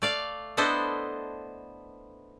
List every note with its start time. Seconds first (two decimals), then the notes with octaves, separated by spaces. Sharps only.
0.02 A3 D5 F5
0.57 B3 D4 E4 A4 C5 D#5